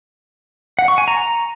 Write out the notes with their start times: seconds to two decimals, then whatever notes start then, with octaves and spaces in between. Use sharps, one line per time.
0.79 F#5
0.88 C#6
0.98 G#5
1.08 A#5